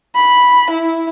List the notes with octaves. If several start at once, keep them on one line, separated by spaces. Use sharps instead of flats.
B5
E4